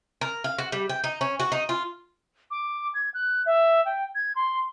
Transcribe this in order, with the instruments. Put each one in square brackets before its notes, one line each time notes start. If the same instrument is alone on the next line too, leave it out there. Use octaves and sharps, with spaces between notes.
[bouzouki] A#4
F5
F#4
G3
G5
D#4
C#4
F#4
D#4
F4
[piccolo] D6
G#6
F#6
E5
G5
G#6
C6